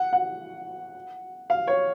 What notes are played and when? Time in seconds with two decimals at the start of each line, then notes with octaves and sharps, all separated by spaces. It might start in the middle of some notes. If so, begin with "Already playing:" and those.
Already playing: F#5
0.13 F#5
1.50 F5
1.67 C#5